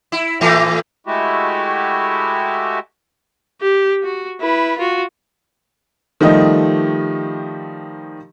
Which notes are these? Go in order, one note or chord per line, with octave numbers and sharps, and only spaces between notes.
E4
A2 E3 A3
G#3 A3 E4 F#4 G4
G4
F#4
E4 B4
F4 F#4
D#3 F3 G3 A3 G4 D#5